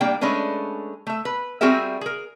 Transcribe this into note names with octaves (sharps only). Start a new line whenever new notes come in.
G3 A#3 D4 G5
G#3 A3 C#4 D4 B4
A3 E5
B4
G3 C4 F#4 G#4 A#4 E5
G#4 A#4